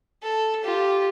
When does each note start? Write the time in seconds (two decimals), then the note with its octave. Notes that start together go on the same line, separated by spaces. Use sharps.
0.23 A4
0.64 F4 G4